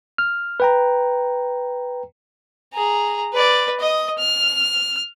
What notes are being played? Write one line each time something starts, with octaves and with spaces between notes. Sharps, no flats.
F6
B4 G5 A#5
G#4 A#5
B4 D5
D#5 D#6
F6